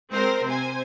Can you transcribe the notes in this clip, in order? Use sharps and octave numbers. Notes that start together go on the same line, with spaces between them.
G#3 C4 A#4 C5
C3 C5 G#5